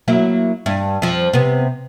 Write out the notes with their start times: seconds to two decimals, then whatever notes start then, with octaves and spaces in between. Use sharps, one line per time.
0.08 F#3 A#3 E4
0.66 G2
1.02 F2 F3
1.33 C3 B3